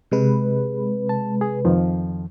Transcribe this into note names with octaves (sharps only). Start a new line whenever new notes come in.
C3 G#3 B4
A5
G#4
F2 D#3 F3